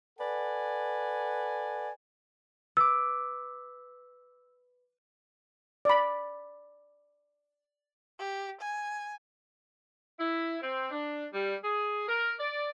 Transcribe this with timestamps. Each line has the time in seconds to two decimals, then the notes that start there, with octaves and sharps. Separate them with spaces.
0.19 A4 B4 D5 F#5 G#5
2.77 B4 D6 E6
5.85 D5 B5
8.19 G4
8.61 G#5
10.19 E4
10.62 C4
10.91 D4
11.34 G3
11.64 G#4
12.08 A#4
12.39 D5